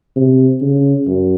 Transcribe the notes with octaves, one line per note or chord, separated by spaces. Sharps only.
C3
C#3
F#2